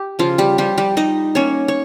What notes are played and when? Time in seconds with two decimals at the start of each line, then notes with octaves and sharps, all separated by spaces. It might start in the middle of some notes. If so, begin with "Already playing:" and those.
Already playing: G4
0.19 C#3 F3 F4
0.38 G3 G4
0.58 F3 G3 G4
0.78 G3 G4
0.97 G3 D#4 D#5
1.35 A#3 C#4 C#5
1.68 C#5